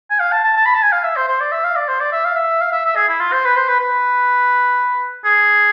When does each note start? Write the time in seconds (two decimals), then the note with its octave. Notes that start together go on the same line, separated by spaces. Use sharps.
0.11 G#5
0.20 F5
0.32 A5
0.44 A5
0.57 A5
0.66 B5
0.75 A5
0.83 G#5
0.92 F5
1.04 E5
1.16 C5
1.28 C5
1.41 D5
1.52 E5
1.64 F5
1.76 D5
1.88 C5
2.00 D5
2.12 E5
2.25 F5
2.36 E5
2.61 F5
2.72 E5
2.85 E5
2.96 G#4
3.09 E4
3.20 F4
3.32 C5
3.45 B4
3.56 C5
3.68 B4
3.80 B4
5.25 G#4